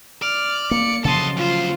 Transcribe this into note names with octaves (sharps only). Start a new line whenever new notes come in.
D5 F6
A#3 C#7
C#3 F3 F#3 A4 D#5 A5 C6
D2 F4 C5